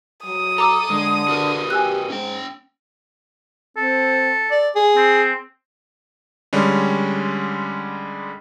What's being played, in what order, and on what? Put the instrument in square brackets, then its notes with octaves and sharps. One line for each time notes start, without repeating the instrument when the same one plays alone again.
[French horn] F#3 [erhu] D#6
[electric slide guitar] A4 [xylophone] A#5 D6 E6
[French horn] D3 [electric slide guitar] G#3
[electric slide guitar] F#4 A#4 B4
[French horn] G4 [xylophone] G#5 E6 F#6
[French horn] G#2 [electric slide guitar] C#4 G5
[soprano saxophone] C4 [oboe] A4
[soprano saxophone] D5
G#4
[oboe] C4
[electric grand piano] D3 G3 G#3 C#4